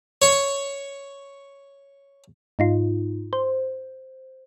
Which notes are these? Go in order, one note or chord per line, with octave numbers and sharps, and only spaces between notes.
C#5 C#6
G#2 D#4 F4
C5